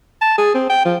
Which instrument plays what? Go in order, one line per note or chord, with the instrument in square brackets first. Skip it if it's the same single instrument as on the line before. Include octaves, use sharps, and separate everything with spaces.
[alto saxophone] A5
G#4
C4
G5
F3